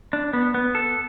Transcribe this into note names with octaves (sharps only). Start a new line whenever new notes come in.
D4
B3
B3
A4